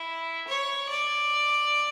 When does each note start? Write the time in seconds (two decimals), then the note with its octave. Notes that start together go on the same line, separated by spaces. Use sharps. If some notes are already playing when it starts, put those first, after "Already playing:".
Already playing: E4
0.48 C#5
0.89 D5